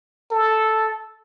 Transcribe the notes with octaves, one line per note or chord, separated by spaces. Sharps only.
A4